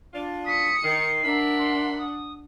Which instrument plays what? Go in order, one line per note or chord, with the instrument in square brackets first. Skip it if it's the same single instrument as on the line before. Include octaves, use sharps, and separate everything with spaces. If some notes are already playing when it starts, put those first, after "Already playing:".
[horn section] D4 F4
[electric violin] D#6 C#7 [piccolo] B6
[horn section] D#3 [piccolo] C7
[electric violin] D4 F#5 [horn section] A#4 E5 B5
[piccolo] C6
D#6